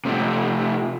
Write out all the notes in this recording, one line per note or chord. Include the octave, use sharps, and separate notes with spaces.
C3 A3